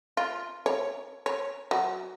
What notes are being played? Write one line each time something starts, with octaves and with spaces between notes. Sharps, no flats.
F4
C#5
C#5
F#3